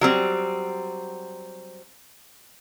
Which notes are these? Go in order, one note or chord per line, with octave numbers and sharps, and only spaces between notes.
F#3 G3 C4